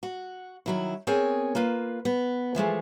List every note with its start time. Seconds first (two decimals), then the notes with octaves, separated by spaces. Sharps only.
0.03 F#4
0.66 D#3 F#3 E4
1.07 B3 C4 G#4 A#4 C#5 G#5
1.55 A#3 F4 B4
2.05 B3
2.55 E3 F3 G#3 A3